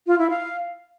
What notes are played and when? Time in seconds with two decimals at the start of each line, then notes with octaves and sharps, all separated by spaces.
0.07 F4
0.19 E4
0.30 F5